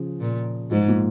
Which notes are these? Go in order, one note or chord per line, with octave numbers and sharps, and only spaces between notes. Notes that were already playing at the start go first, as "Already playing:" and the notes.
Already playing: C#3 F3
A#2
G#2 F3 G#3
A#2